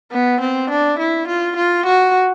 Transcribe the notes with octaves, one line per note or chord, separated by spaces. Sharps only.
B3
C4
D4
E4
F4
F4
F#4